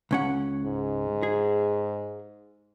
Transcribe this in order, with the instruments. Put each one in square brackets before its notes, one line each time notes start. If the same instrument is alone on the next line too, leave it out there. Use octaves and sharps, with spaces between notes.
[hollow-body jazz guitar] C#2 C#4 F#5
[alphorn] G#2
[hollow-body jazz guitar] G#4